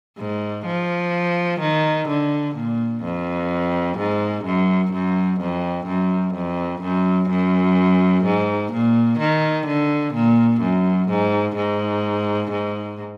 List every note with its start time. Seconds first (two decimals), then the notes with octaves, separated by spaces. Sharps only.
0.19 G#2
0.66 F3
1.60 D#3
2.08 D3
2.56 A#2
3.03 F2
3.98 G#2
4.45 F#2
4.93 F#2
5.40 F2
5.87 F#2
6.35 F2
6.82 F#2
7.30 F#2
8.25 G#2
8.72 A#2
9.19 D#3
9.67 D3
10.14 A#2
10.61 F#2
11.09 G#2
11.56 G#2
12.51 G#2